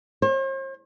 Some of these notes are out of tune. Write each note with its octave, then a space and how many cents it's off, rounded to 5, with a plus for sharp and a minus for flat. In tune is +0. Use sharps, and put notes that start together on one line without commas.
C5 +45